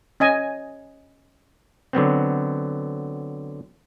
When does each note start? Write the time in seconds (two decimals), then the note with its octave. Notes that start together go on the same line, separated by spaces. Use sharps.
0.20 C#4 D#5 G#5
1.93 D3 F#3 B3 C4